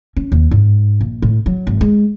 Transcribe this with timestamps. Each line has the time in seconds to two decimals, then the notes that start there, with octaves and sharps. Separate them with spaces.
0.17 C#4
0.32 D#2
0.51 G#2
1.01 A#1
1.22 A2
1.46 F#3
1.67 G#1
1.81 G#3